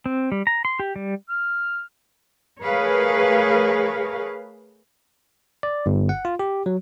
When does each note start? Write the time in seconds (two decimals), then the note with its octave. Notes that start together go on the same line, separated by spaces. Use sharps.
0.06 C4
0.32 G3
0.47 A#5
0.65 C6
0.80 G4
0.96 G3
1.29 F6
2.63 A3 G#4 A#4 B4 C#5 F5
5.63 D5
5.86 G1
6.09 F#5
6.25 F4
6.39 G4
6.66 F#3